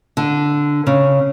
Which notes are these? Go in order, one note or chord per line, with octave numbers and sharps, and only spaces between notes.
D3
C#3